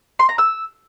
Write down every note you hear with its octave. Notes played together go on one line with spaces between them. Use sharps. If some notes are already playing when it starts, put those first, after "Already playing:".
C6
A#5
E6